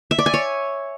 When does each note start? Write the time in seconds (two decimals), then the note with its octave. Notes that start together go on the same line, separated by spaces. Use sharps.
0.11 E5
0.18 D5
0.26 G#5
0.34 C#5